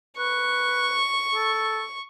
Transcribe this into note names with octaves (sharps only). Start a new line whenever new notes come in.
B4 C#6
A4